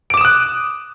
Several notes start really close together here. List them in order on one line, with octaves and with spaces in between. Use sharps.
D7 D6 E7 D#6 F#6